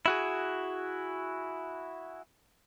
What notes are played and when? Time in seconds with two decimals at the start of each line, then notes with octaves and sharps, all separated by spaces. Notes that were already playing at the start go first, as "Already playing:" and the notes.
0.06 E4 F#4 G#4